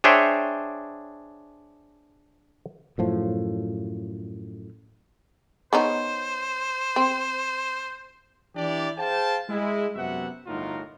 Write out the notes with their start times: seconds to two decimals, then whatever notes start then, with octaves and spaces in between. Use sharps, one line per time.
0.04 D4 G#4 C5 C#5 E5 G5
2.98 F#2 A2 F3
5.73 B3 C#4 D#4 C5
6.96 C4
8.56 E3 D4 E4 G4 D5
8.98 G#4 C5 F5 G5 A5
9.49 G#3 E4
9.96 F#2 C3 B3 F#4 E5 F#5
10.47 G1 A2 D#4 F4 F#4 A#4